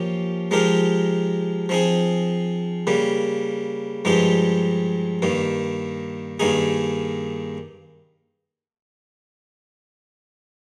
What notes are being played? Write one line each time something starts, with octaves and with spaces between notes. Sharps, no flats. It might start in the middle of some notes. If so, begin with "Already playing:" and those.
Already playing: F3 A#3 C#4 G4
F3 G#3 D#4 G4 A#4
F3 C4 D#4 G#4
C#3 G3 A#3
G2 F3 G#3 D#4 G4
G2 D#3 A#3
G2 D#3 A#3 D#4 G#4